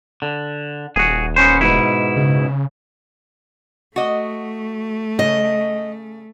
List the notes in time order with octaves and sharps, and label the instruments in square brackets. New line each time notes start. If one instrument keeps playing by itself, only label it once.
[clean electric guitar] D3
[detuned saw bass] D#1 [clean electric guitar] F#4 G#4
[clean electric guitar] B3 C#4 C5
G#2 B2 E4
[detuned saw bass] C#3
[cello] A3 [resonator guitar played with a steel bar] F#4 D#5
[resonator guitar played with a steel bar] C#3 [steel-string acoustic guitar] D#5